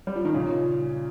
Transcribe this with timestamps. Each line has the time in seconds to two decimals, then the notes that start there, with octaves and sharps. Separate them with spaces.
0.07 G3
0.16 F3
0.25 D#3
0.34 A#2 C#3